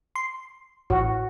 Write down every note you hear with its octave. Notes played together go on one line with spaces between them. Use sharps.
C6
A1 F#4